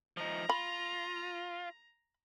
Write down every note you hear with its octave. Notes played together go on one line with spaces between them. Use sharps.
F3 D#4 A#5
F4 B5